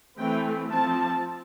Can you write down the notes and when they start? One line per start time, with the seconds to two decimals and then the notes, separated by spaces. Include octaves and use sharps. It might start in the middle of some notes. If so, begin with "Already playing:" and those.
0.18 E3 A3 C4 G5
0.71 F3 C4 A5